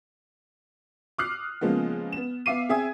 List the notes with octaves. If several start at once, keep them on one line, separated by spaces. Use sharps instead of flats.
D6 D#6 F6 F#6 C7
C#3 F3 G#3 A#3 B3
B3 E7
B3 E5 F5 D6 C7 D#7
C4 G#4 E5 G#5 D#6 G#6